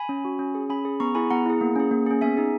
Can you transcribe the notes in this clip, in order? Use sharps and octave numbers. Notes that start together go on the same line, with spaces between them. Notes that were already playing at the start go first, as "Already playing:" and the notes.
Already playing: G#5 B5
C#4
F#4
C#4
G#4
C#4 G#5 B5
G#4
B3 A#5 C#6
E4 G#4 G#5 B5
B3 F#5 A#5
E4 G#4
A#3
C#4 G#4
A#3
C#4 G#4
B3 E5 G#5
D#4 G#4